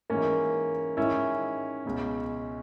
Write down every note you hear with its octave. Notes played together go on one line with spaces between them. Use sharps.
G#2 E3 A#3 C#4
G#2 D#3 C#4 E4
C#2 B2